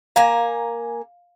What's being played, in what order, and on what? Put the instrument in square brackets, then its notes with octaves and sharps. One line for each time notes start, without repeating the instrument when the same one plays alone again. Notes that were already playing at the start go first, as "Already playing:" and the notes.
[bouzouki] A#3 G#5 A#5 [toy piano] F5